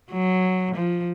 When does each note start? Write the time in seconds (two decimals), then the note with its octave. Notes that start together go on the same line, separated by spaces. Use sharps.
0.12 F#3
0.75 F3